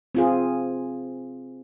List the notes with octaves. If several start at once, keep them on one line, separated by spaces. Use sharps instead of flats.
C4 F4 G#4